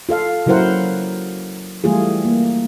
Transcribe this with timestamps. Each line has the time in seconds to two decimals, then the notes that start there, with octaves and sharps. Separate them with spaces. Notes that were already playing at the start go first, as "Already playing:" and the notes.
0.09 F4 A4 F5
0.46 C#3 F#3 E4 A#4 C5 F#5
1.84 E3 G3 A3 F4 G#4
2.25 A#3